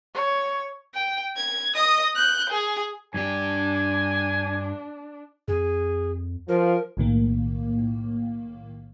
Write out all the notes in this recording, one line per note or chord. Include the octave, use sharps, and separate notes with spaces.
C#5
G5
G#6
D#5 D#6
F#6 G6
G#4
G2 D4 G4 G#5
F2 G#4
F3 A#4
B1 A2 D#3 A#3